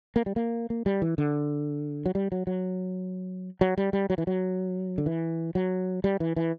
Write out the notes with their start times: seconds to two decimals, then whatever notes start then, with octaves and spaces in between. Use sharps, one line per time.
0.16 A#3
0.26 G3
0.36 A#3
0.70 A#3
0.86 G3
1.02 E3
1.18 D3
2.06 F#3
2.15 G3
2.32 F#3
2.47 F#3
3.61 F#3
3.78 G3
3.93 G3
4.10 F#3
4.18 E3
4.27 F#3
4.98 D3
5.06 E3
5.55 F#3
6.04 G3
6.20 E3
6.36 E3